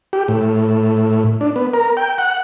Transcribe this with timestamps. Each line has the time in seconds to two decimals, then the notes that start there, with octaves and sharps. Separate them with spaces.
0.13 G4
0.28 A2
1.41 D4
1.56 B3
1.73 A#4
1.97 G5
2.18 F#5